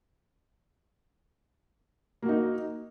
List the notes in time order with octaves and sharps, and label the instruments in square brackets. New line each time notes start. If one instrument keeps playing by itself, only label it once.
[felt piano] A#3
F#4
D#4